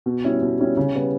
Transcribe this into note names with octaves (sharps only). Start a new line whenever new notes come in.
B2
G3 C#4 E4
B2
G3 C#4 E4
C#3
G3 B3